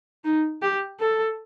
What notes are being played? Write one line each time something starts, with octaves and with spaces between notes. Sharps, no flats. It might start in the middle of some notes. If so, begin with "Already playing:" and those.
D#4
G4
A4